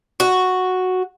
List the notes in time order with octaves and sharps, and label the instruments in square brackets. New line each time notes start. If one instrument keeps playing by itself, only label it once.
[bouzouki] F#4